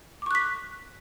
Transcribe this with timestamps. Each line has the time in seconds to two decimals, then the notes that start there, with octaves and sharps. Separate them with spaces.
0.22 D6
0.26 C#6
0.31 F#6
0.35 B6